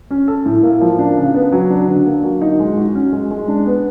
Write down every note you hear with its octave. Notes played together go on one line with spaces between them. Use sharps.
C#4
A4
A2
A#3
F3
D4
C#3
B3
F#3
D4
D3
A#3
F#3
D#4
G#3
F#4
C#4
G#3
G#3
D4
B3